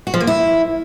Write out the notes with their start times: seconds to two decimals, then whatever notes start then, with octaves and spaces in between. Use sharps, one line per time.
0.07 F#4
0.14 F3
0.20 A#3
0.27 E4